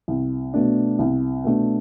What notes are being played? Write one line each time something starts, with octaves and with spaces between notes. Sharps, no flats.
C2
B2 A3 D4
C2
B2 A3 D4